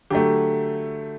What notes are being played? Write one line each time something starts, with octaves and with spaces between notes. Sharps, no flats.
D3 F#3 A3 G4